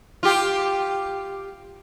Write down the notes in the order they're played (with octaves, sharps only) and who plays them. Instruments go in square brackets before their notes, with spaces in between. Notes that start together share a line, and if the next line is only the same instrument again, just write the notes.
[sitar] F4 G4